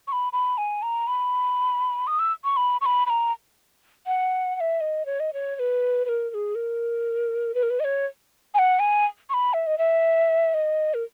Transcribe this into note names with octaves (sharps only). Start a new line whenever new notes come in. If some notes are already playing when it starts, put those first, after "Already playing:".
C#6
B5
B5
G#5
A#5
B5
D#6
E6
C#6
B5
C#6
B5
B5
A#5
F#5
F#5
E5
D#5
C#5
D#5
C#5
C#5
B4
B4
A#4
A#4
G#4
A#4
B4
A#4
B4
D#5
C#5
G#5
F#5
G#5
C#6
B5
E5
D#5
E5
D#5
A#4